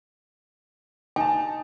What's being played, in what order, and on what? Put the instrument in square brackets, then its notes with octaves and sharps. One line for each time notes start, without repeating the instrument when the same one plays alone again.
[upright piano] D#4 A5 [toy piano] G#5